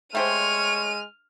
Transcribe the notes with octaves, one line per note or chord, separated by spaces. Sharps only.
G#3 A3 G4 C5 C#5 F6 D#7